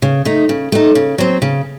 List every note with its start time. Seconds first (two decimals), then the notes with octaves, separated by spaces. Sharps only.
0.02 C#3
0.25 A3 D#4
0.49 C#3
0.72 A3 D#4
0.95 C#3
1.18 F#3 C4
1.42 C#3